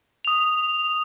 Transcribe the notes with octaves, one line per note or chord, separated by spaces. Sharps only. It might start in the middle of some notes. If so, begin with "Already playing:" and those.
D#6 F7